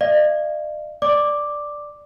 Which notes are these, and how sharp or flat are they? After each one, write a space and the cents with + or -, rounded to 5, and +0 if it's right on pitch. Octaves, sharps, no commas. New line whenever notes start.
D5 +45 F5 -40
D5 +0 D6 +0